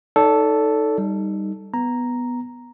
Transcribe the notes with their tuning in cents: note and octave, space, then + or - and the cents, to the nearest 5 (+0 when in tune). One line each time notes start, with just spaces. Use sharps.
D#4 +0 A4 +0 D5 -45
G3 +0 D#4 +0
B3 +0 A#5 +0